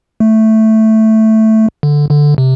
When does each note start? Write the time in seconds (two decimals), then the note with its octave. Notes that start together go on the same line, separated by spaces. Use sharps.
0.20 A3
1.83 D3
2.10 D3
2.38 C3